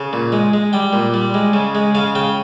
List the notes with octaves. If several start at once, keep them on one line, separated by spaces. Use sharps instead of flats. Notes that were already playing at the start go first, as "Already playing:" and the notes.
Already playing: C#3
A#2
G#3
G#3
G3 G5
A#2
G3
G#3
C#3
G#3
C#3 F5
C#3 G5